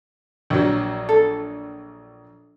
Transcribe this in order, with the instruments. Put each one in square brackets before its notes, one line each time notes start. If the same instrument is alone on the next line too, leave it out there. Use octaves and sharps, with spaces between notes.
[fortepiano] A#1 F#3
[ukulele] A4